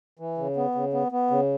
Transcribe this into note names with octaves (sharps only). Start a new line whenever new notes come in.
E3
C#3
B3
C#3
B3
B3
C#3